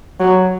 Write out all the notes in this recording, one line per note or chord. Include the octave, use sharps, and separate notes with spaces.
F#3